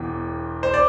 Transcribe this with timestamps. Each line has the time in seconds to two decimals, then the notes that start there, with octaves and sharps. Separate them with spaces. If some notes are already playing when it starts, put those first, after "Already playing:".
Already playing: E1 E2 E3 G5
0.63 C5
0.74 D5